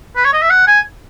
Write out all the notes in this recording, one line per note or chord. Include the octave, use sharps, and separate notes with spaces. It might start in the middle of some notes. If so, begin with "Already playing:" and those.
B4
C#5
D#5
E5
F#5
G#5